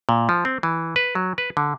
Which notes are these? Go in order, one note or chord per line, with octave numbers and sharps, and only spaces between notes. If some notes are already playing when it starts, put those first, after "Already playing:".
A#2
F3
C4
E3
B4
F#3
B4
D3